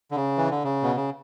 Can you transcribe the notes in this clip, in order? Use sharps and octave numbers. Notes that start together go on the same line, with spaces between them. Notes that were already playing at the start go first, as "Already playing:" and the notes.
D3
C#3
E3
D3
C#3
B2
C#3